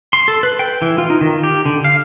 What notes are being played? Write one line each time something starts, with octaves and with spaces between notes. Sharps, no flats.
C6
A4
B4
G5
E3
F4
D#4
D#3
G4
D3
F5